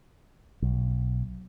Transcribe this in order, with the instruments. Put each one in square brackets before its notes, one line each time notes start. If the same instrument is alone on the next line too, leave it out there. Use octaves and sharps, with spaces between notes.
[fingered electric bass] B1